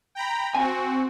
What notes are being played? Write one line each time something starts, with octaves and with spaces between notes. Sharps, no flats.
G5 A#5 B5
C4 F#4 G#5